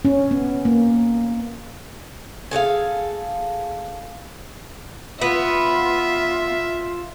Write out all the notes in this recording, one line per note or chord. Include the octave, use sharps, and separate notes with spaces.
C#4
B3
A#3
G#4 A4 D5 F5
B3 F4 E5